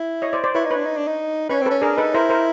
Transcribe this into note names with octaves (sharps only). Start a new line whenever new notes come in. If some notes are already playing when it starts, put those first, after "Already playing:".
Already playing: E4
C#5 D#5
C5 D5
C5 D5
E4 B4 C#5
D#4
B4 C#5
D4
D#4
D4
D#4
C#4 B4 C#5
C4
C#4 A4 B4
D4 G#4 A#4
D#4 A4 B4
E4 A#4 C5
A#4 C5